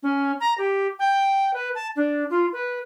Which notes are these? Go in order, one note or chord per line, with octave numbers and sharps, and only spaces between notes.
C#4
A#5
G4
G5
B4
A5
D4
F4
B4